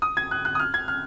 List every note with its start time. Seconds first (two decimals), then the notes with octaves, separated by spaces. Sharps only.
0.02 D#6
0.17 G#6
0.31 F#6
0.45 F#6
0.55 D#6
0.60 F6
0.74 G#6
0.88 F6